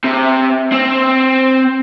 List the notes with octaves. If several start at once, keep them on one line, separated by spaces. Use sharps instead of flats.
C3
C4